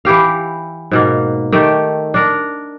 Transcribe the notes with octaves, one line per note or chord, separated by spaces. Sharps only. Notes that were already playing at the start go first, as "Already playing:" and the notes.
E3 E4 G4 F5
G#2 B2 A#3
D#3 A3 G4
D4 A#4